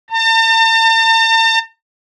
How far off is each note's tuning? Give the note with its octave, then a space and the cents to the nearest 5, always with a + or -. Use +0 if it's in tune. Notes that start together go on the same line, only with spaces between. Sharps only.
A5 +45